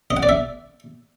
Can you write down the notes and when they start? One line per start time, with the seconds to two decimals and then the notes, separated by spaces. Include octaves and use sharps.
0.11 D#5
0.17 F#5
0.23 D5
0.29 E5